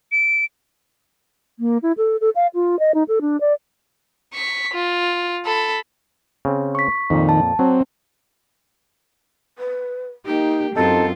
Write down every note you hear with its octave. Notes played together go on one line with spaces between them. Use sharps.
D7
A#3
E4
A4
A4
F5
F4
D#5
D#4
A4
D4
D5
C#6 B6
F4
A4 B5
C#3 C4
C#6 B6
F2 A#2 D#3
A5
F#3 C4
B4
A#3 D#4 G4
F#2 C4 D#4 F4 A4 A5